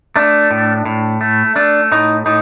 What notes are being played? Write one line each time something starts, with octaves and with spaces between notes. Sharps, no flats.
A3 D4
A2
A2
A3
A3 D4
A2 D#4
A2 D#4